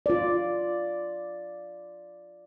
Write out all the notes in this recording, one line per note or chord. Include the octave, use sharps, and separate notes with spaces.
F4 D5